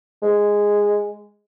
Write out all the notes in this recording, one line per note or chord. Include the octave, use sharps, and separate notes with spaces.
G#3